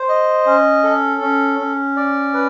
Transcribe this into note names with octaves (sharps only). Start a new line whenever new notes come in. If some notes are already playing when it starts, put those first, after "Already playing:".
Already playing: C5
D#5
C#4
A4
C#4
C#4
D5
B4